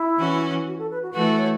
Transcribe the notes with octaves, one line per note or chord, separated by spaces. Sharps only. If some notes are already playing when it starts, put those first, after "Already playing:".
Already playing: E4
E3 C#4 F#4
F#4
A4
B4
F#4
E3 A3 F#4 A4 B4
C#5